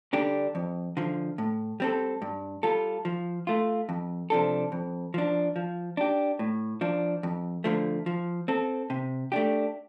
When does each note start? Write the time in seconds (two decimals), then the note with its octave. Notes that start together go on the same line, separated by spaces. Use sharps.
0.13 D3 G3 D4 G4
0.55 F2
0.97 D3 F3
1.38 A2
1.80 G3 C4 A4
2.22 G2
2.63 G3 F4 A4
3.05 F3
3.47 A3 F4
3.89 F2
4.30 C3 F3 D4 A4
4.72 F2
5.14 F3 D4
5.56 F3
5.97 D4 G4
6.39 A2
6.81 F3 D4
7.23 F2
7.64 D3 F3 A3
8.06 F3
8.48 C4 A4
8.90 C3
9.32 A3 D4 G4